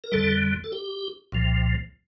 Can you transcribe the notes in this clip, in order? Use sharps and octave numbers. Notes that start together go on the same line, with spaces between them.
A#4
F2 D3 G3 A4
A4
G4
C2 A#2 F3